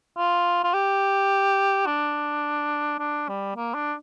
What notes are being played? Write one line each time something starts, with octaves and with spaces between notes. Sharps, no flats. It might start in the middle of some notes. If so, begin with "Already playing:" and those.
F4
F4
G4
D4
D4
G3
A#3
D4